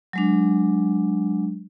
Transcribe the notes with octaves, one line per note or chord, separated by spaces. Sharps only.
F#3 G#3 D4